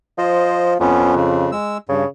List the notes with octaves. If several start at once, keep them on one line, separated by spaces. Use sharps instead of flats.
F3 C5 D#5
F2 B3 C#4
C#3
G#3 E6
G2 C#3